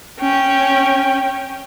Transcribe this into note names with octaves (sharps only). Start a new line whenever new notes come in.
C#4 G5